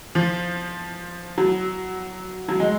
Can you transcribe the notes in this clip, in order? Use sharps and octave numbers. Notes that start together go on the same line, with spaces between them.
F3
F#3
F#3
G#3